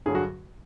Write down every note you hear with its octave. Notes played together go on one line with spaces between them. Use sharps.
G2 D3 F#3 G#4
F#4